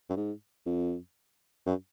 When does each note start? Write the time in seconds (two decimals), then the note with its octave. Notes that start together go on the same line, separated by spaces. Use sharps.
0.10 F#2
0.17 G#2
0.66 F2
1.66 F#2